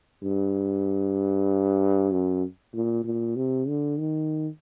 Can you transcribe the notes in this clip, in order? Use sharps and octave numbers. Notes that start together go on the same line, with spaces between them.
G2
F#2
A#2
A#2
C3
D3
D#3